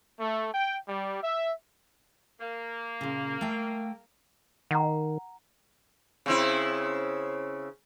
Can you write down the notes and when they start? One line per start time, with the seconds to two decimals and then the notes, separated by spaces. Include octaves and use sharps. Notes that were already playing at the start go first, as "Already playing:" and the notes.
0.20 A3
0.54 G5
0.88 G3
1.24 E5
2.40 A#3
3.01 A#2 C#3
3.41 A3 G5
4.71 D#3 F#5 A#5
6.26 C#3 C4 E4